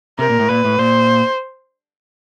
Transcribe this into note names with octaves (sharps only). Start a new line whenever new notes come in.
C3 A#4
A#2
A2
A#2 B4
A2
A#2 C5